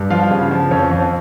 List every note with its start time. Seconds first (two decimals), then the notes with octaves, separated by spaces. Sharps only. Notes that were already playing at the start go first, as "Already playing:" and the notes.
Already playing: G2
0.10 F3 F4 F5
0.31 C#3
0.51 F3
0.71 F2 C#4 C#5
0.91 F2